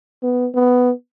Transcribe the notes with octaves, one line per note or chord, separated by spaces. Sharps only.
B3
B3